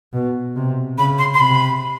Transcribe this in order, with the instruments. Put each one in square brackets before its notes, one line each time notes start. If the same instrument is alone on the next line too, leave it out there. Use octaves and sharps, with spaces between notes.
[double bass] B2
C3
[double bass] C#3 [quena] B5
[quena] C6
C6
[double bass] C3 [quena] B5